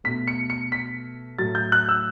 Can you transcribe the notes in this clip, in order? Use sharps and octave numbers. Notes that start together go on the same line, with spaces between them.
B2 A3 B6
C#7
C#7
B6
A2 F#3 A3 A6
G6
F#6
E6